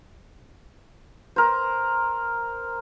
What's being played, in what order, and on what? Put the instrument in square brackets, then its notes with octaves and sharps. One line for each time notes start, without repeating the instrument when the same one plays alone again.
[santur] A#4 C5